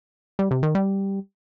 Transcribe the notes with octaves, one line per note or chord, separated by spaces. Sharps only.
G3
C3
D#3
G3